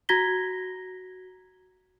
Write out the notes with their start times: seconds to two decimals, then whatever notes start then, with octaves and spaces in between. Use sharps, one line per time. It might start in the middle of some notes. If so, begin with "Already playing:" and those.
0.09 F#4 A#5 G#6 A#6 B6 G7